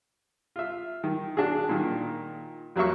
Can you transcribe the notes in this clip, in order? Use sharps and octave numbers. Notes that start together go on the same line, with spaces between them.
F4 E5
D#3
D4 F#4 G#4
A#2 D#3
F2 F#3 A#3 E5 C#6